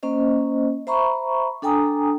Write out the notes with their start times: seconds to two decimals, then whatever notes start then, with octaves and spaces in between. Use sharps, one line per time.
0.03 A#3 C#4 C5 D#5
0.87 C5 E5 A#5 B5 C#6
1.62 D4 A4 G5 G#5 A#5 D#6